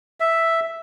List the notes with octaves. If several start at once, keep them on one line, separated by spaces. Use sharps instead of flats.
E5